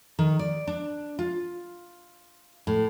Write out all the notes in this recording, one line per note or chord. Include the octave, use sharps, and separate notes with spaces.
D#3
D5
D4
F4
A2